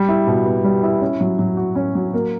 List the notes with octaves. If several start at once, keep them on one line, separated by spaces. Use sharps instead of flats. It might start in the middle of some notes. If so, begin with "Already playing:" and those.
Already playing: G3
E4
B2
B3
G3
E4
C#4
F#3
F#3
F#4
C#4
F#3
A#3